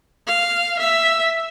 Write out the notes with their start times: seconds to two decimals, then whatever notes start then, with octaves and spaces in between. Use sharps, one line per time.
0.27 F5
0.79 E5